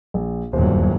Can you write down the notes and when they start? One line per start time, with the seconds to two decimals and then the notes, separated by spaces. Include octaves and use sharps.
0.14 A#1
0.53 D#1 E2 G2 F#3 C5